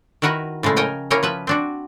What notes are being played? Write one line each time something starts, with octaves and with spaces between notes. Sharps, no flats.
D#3 E4 F#4 A#4 B4
A2 C#3 F3 G#3 A3
A#4 C#5 D#5 G5 G#5
A#3 C#4 E4 A#4 C#5 G5
F3 B4 E5
C4 D4 F#4